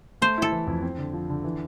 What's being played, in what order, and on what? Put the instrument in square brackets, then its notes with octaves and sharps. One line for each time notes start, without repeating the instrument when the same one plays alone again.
[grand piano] A3 [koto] C5
[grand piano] E4 [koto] A4
[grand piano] E3
F2
C4
D3
F3
D3
E3